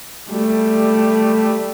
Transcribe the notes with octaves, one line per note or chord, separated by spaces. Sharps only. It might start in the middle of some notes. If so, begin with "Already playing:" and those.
G3 A3